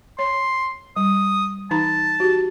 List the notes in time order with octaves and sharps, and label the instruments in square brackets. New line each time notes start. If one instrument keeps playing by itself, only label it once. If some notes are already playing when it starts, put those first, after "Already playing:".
[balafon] C#5 [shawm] C6
[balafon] G3 [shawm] D#6
[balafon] E3 D#4 A#5 [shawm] A5
[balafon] F#4 G4